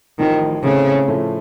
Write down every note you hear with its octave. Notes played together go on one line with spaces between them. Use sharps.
A1 A2 D#3 F3
A2 C#3 A3 C4
A2 F3 A3